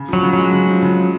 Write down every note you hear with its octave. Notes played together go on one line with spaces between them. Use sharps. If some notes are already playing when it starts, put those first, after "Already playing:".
Already playing: C#3
F3 F#3
C#3
F#3
G#3
C#3
F3
C#3
G#3